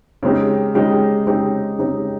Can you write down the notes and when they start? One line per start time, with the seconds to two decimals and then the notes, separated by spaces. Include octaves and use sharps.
0.23 C#3 G#3 C4 D#4 G4
0.74 C#3 G#3 C4 D#4 G4
1.27 C#3 G#3 C4 D#4 G4
1.79 C#3 G#3 C4 D#4 G4